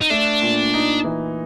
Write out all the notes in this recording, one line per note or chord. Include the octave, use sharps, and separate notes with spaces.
D#4
A3 D4
A#2
D#4
E3